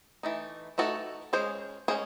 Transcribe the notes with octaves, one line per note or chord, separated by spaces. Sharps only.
E3 A3 D#4
E3 A3 D#4 F#4 A4
G#3 C#4 G#4 C5
G#3 C#4 G#4 C5